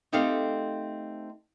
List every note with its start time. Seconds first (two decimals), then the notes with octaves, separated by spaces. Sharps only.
0.12 A3 C4 D#4 G4 A4 F5